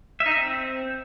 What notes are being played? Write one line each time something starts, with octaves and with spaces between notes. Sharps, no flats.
E5
D#4
E5
C4